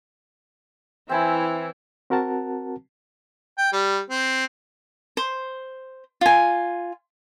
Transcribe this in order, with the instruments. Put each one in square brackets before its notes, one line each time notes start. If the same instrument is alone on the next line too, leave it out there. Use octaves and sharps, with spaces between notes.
[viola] E3 E4 [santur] C4 G#5 B5
[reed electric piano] C4 F#4 A#4 F#5 A5
[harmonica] G5
G3
C4
[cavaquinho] C5
F4 G#5